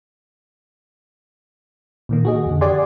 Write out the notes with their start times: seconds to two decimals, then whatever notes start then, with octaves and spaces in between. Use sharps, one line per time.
2.09 A#2 D#3 A#3
2.25 F#4 G#4 D#5
2.46 F2 D3
2.61 G4 G#4 D5 F#5 G#5 C6